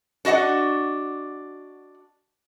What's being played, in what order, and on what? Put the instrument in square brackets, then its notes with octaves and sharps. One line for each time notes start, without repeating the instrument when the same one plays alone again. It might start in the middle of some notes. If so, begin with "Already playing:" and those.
[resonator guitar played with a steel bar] D4 F#4 D#5 F5 F#5